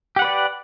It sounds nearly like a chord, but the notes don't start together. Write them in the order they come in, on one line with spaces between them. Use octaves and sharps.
G4 F#5 B4 D5